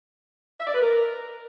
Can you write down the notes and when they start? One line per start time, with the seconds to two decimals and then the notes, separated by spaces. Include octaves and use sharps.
0.60 E5
0.67 D5
0.74 B4
0.82 A#4